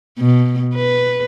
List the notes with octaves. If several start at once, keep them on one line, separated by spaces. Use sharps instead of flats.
B2
B4